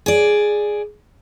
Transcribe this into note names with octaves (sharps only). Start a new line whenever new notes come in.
G#4 D5